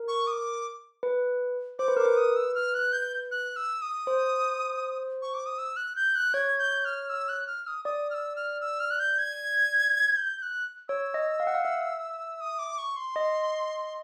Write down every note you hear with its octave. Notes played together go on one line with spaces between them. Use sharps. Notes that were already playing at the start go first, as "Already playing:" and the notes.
Already playing: A#4
C#6
D#6
D6
B4
C5 D6
B4
A#4 D6
B4
D#6
E6
F6
F#6
G6
F#6
E6
D#6
C5
C#6
D6
D#6
E6
F#6
G6
F#6
C#5 G#6
G6
F6
E6
F#6
F6
D#6
D5 D#6
F6
E6
F6
E6
F6
F#6
G6
G#6
G#6
G6
G6
F#6
C#5 E6
D#5
F5
F#5
F5
E5
D#6
D6
C#6
C6
D#5